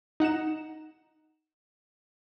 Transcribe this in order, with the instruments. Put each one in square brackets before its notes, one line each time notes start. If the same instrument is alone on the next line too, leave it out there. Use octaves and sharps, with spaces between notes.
[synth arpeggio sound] D#4 F#5 A#5 E7